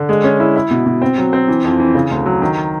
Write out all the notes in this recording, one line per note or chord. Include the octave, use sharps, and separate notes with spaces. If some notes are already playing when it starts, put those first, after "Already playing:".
Already playing: D3
G#3
C#4
E4
E4
B2
B2
C4
F#3
C4
E3
F2
E3
C#3
D2
F#3
D#3